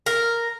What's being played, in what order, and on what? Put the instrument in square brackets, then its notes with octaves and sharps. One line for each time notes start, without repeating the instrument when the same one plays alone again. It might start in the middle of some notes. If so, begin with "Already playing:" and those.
[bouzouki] A#4